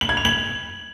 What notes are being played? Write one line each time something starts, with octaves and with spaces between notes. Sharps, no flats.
F#7
G#6
F7
F#7